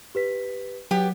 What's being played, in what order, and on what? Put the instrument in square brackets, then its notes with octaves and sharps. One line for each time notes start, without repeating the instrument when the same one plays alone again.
[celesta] G4 B4 B6
[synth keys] F#3 [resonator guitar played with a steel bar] B3 G4